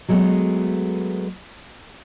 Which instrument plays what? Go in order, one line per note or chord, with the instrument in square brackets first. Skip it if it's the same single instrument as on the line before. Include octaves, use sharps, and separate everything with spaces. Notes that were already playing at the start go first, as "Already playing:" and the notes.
[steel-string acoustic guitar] F#3 G#3 A3 B3